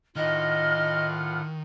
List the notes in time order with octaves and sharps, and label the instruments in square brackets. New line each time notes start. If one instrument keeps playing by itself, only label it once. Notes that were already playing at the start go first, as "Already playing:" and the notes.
[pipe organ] A2 F4 F#5 [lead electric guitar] D#3 [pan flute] D#5 [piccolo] F6